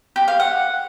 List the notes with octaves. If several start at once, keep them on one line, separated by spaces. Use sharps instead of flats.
G4
F5
F#5